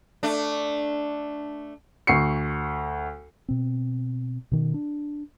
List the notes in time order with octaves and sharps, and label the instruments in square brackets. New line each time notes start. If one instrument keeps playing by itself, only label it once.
[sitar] A3 D4
[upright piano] D2 C#6 C7 C#7
[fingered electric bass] B2 C4
B2 D#3
D4